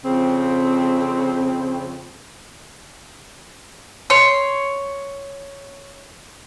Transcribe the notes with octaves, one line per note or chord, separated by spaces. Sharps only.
F2 C#3 C4
C#5 C6